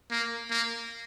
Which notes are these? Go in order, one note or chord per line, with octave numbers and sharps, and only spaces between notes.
A#3
A#3